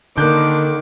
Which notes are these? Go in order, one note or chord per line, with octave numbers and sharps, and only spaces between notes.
D3 D#3 A#3 D6 F#6 G6